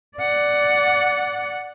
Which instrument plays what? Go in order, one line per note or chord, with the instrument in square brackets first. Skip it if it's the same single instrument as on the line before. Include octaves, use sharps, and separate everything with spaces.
[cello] D5 F#5